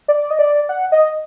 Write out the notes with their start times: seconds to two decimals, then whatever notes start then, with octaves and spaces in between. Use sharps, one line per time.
0.08 D5
0.30 D#5
0.39 D5
0.69 F#5
0.92 D#5